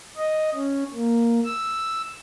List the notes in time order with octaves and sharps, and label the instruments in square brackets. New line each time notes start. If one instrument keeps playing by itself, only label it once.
[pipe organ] D#5
C#4
A#3
E6